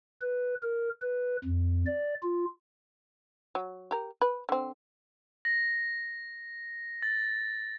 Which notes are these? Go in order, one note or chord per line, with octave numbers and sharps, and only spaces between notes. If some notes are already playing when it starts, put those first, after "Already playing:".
B4
A#4
B4
F2
D5
F4
F#3
G4 A#4
B4
D3 C4
A#6
A6